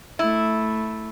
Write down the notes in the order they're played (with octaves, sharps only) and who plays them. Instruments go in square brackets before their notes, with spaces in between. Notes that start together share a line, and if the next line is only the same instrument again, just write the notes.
[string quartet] A3 [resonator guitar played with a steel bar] E4